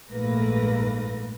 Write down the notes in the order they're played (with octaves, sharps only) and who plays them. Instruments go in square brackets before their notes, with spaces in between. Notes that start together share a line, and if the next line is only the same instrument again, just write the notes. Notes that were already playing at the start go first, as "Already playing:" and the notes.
[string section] A#1 G#2 A3 A#3 B4 A#6